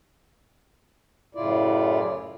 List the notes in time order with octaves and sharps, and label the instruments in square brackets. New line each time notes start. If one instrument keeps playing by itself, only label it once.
[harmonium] F#2 A2 C#3 E4 F4 D5